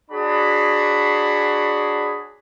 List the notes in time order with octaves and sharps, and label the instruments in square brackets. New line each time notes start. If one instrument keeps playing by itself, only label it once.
[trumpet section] D4 F#4 G#4 C#5 B5